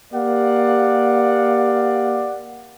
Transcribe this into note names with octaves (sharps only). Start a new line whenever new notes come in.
A#3 G4 D5 F5 F#5